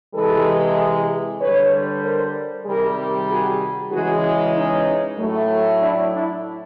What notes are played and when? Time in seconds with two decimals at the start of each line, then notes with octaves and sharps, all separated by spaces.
0.14 C3 E3 G#3 A4 B4
1.40 D3 G3 B4 C#5
2.03 A#4 C5
2.66 C3 D#3 G3 G#4 A#4
3.29 F#4 G#4
3.92 C#3 E3 G#3 F#4 G#4
4.55 C#4 D#4
5.18 A2 F#3 A3
5.81 D4 E4
6.13 D4 E4